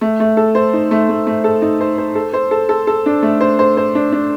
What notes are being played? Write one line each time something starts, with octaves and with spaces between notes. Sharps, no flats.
A3
A3
A4
C5
D#4
A3
A3
A3
A4
D#4
C5
C5
A4
C5
A4
A4
A4
D4
A3
C5
C5
C5
D4
D4